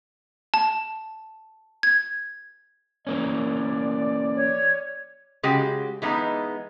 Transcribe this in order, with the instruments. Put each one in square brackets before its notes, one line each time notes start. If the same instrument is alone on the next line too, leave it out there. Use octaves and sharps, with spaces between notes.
[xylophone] A5
G#6
[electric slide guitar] E3 A#3 C#4 [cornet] D5
[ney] C#5
[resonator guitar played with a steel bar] C#3 G#3 F#4 G4
E3 G#3 B3 D#4